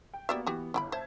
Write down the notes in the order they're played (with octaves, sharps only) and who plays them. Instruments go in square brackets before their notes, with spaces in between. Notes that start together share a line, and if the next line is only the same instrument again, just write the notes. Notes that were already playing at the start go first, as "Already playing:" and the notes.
[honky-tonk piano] G5
[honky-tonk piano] A#3 B3 F#4 [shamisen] G4 D5 E5
[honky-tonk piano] E3 B3 [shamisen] F#4 G4
[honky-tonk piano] G1 [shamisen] E4 G5 B5
[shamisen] C5 [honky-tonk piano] E5 A5 G#6